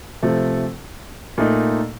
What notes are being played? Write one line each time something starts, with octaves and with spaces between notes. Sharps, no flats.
C3 F3 A3
A#2 A3 D#4